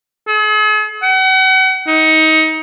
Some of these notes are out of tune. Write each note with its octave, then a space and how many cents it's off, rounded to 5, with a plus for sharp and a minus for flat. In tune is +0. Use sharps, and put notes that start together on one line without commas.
G#4 +45
F#5 +35
D#4 +25